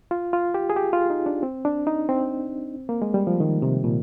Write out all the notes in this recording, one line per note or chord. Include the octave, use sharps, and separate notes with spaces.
F4
F4
G4
G#4
G4
F4
D#4
D4
C4
D4
D#4
C4
A#3
G#3
G3
F3
D#3
C3
A#2